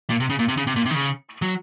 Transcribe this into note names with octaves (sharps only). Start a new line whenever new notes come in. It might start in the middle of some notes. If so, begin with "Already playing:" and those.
A#2
C3
C#3
A#2
C3
C#3
C3
A#2
C3
D#3
C#3
F#3